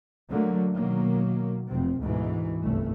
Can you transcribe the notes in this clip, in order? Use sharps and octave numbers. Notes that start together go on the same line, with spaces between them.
D3 F#3 A3 A#3
B2 D#3 F#3 A#3
F1 C3 C4
D2 G#2 B2 E3
G1 C2 A3